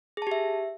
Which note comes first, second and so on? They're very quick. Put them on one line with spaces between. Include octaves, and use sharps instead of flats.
G#4 A5 G4 E5